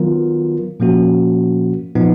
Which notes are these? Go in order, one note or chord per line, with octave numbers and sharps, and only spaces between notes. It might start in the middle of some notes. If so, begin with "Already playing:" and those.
Already playing: D#3 F#3 B3 F4 A#4
A#2 F3 A#3 C#4 F#4
A#2 F3 B3 D#4